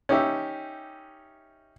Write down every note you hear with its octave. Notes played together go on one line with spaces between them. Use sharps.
C#4 D#4 G4 E5